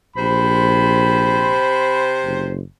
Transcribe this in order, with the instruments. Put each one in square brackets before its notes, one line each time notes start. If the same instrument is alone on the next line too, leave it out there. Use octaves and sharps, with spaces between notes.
[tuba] A#1 [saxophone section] C3 C5 [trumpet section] B5
[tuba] F#1